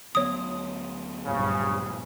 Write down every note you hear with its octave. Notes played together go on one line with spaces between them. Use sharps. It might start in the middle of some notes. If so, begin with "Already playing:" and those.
D2 F#3 B3 C#5 D#6
A#1 G2 C#3